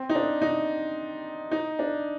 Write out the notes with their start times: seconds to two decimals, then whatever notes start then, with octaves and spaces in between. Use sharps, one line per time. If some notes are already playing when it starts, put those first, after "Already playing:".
Already playing: C4
0.09 D#4
0.15 D4
0.41 D#4
1.51 D#4
1.79 D4